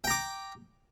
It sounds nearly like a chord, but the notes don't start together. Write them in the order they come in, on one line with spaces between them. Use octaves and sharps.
G5 A#5 D6